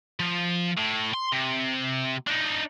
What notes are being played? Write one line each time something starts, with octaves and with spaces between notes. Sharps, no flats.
F3
A2
C6
C3
D4 D#4